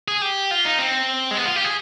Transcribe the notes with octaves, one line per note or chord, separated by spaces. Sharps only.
G#4
G4
F4
D#4
C4
G#3
B3
F4
G4
G#4